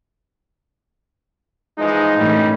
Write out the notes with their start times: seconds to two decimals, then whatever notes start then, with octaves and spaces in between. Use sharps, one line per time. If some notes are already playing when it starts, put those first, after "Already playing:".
1.78 E3 F3 G#3 D#4
2.18 A#1 A2 E3 G3 C#4